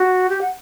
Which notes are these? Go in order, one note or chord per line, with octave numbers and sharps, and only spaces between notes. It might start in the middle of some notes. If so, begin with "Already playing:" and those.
Already playing: F#4
G4
F#5